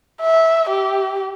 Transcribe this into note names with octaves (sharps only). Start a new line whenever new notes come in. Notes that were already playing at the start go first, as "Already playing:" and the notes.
E5
G4